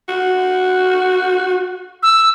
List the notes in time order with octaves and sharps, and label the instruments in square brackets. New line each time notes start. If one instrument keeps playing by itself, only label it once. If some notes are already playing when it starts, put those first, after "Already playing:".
[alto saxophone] F#4
[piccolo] E6